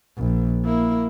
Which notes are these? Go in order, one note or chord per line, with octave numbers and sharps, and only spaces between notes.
A#1
A#3 E4